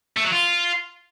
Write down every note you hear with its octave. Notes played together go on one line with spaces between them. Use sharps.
A3
F#3
F4